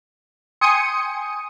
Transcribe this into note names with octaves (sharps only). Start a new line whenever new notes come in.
G5 G#5 C6 D#6 C#7 D#7